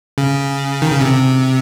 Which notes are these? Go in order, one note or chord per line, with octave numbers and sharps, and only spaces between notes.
C#3
D#3
C#3
C3